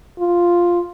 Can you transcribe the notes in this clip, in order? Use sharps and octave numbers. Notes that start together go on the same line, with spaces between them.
F4